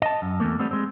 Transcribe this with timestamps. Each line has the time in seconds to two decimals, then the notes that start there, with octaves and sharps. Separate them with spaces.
0.02 D#5 A5
0.22 F#2
0.40 E2 F3 A3 A#3
0.59 G3 A3 B3 C4
0.71 G#3 C4